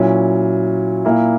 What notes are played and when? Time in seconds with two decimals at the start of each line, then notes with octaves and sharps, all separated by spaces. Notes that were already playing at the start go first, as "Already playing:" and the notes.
Already playing: A#2 F#3 C#4 E4
1.05 A#2 A#3 E4